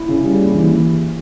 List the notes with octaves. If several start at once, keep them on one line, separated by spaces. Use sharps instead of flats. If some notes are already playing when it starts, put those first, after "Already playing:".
Already playing: E4
C#3
G3
D#2
E3